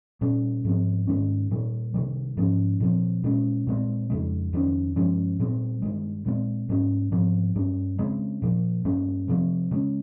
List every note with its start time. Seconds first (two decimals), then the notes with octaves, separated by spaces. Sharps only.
0.21 A#2 G3 C#4
0.65 G#2 F3 C4
1.07 G#2 D#3 G#3 C#4
1.51 A#2 G3 A#3
1.94 C3 D#3 G3
2.37 G#2 F3 A#3 C#4
2.80 A#2 F3 C4
3.24 A#2 G#3 C#4
3.67 A#2 G#3 C4
4.10 F2 C#3 G#3
4.53 F2 D#3 A#3 C#4
4.96 G2 F3 G#3 C#4
5.39 A#2 G3 C4
5.82 G2 D#3 G#3
6.26 A#2 G#3 C4
6.69 G#2 G3 A#3 C#4
7.12 G#2 F3 C4
7.55 G2 G3 C#4
7.98 C#3 G#3 C4
8.42 A#2 F3 A#3
8.85 G2 G3 A#3 C#4
9.28 C3 F3 C4
9.71 C#3 G#3 C#4